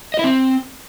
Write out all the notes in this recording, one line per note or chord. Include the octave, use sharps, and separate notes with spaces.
D#5
E4
C4